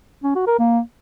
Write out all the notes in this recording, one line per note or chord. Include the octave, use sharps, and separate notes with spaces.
C#4
F#4
A#4
A#3